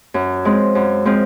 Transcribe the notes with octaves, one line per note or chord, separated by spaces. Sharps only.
F#2
F3 G#3 C4
F#2
F3 G#3 C4